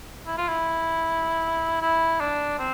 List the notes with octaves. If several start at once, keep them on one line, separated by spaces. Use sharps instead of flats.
E4
F4
E4
E4
D4
C4